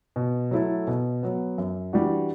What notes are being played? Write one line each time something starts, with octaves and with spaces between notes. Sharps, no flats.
B2
F#3 A3 E4 A4
B2
F#3 B3
F#2
E3 G3 D4 F#4